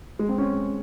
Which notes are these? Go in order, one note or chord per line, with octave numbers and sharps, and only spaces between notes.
G#3
C4
C#4